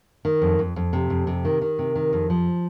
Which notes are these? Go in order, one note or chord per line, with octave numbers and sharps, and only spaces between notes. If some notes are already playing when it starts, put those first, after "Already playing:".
D#3
F2
F2
F2
C3
F2
C3
D#3
D#3
C3
D#3
F2
F3